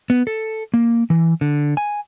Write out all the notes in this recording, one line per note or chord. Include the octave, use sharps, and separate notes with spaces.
B3
A4
A#3
E3
D3
G#5